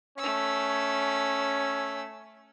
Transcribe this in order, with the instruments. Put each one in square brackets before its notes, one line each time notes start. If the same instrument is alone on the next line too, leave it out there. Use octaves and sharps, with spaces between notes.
[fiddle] A3 E6 [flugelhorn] C#4